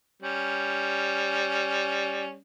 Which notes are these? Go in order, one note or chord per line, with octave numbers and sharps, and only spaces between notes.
G3 C#4